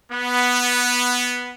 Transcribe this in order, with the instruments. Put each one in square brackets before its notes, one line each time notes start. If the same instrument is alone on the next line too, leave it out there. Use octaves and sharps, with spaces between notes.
[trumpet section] B3